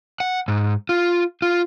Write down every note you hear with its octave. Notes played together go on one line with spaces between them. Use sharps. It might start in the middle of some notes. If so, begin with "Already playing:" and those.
F#5
G#2
F4
F4